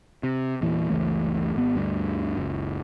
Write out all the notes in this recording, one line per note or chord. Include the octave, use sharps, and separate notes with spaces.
C3
E2 A#2 E3
F#1 C#2 E3 A3
G#1 B3
D2 G2 D3
F#1 C#2